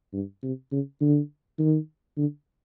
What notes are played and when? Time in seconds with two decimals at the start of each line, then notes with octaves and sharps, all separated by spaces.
0.13 G2
0.43 C3
0.72 C#3
1.01 D3
1.59 D#3
2.17 D3